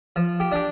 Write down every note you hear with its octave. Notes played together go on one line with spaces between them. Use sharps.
F3
G4
D4 G4